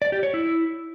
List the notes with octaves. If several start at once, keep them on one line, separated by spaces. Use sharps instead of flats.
D5
G4
C#5
E4